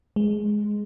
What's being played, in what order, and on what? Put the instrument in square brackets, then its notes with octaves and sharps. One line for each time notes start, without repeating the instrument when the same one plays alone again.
[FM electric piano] G#3